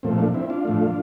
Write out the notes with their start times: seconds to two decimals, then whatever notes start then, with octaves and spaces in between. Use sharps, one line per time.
0.03 A#2 F3 A3 C4
0.19 D4
0.34 C4 E4
0.50 D4 F4
0.65 A2 F3 A3